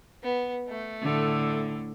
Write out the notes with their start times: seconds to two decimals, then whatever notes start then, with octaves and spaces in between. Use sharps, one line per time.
0.23 B3
0.68 A3
1.02 A2 D3